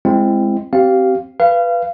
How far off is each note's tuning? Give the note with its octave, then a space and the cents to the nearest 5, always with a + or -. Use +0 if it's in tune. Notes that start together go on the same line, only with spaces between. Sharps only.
G#3 -5 C4 +0 E4 +30
C4 +0 G4 -35 F5 +0
B4 +0 F5 -25